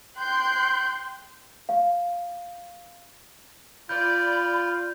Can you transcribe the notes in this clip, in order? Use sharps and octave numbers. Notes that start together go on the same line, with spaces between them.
G5 C6 F#6 G6
F5
F4 D5 B5 G6